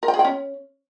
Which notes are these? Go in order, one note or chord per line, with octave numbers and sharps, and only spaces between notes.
A#4
G5
G#4
G5
C#4